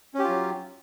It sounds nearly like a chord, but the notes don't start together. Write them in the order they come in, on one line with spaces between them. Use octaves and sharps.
C#4 G4 F4 F#3